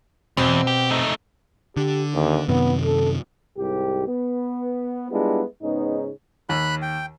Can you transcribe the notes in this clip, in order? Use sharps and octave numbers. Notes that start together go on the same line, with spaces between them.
E2 B2 C4 F#4
G4
A3 D#4
D3 G4
D#2
F#2 C3 D#3 B3
A4
C2 G#2 G4
B3
G3 G#3 B3 D4 E4 F4
G#2 C#3 B3 C#4 D#4
D#2 B5 F#6
G5